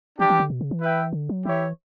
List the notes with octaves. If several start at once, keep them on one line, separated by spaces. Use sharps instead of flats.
E3 G3 D4 G4
E3
D3
B2
C#3
E3
E4 B4 E5 G5
D3
F#3
E3 E4 G4 C#5 E5